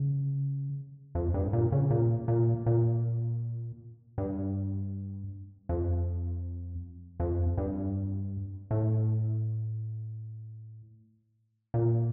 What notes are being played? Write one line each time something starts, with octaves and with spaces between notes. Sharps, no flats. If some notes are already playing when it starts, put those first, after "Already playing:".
Already playing: C#3
F2
G2
A#2
C#3
A#2
A#2
A#2
G2
F2
F2
G2
A2
A#2